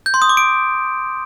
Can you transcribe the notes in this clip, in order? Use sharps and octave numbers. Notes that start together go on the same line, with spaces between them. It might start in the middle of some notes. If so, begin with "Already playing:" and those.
G6
C6
D#6
D6
D7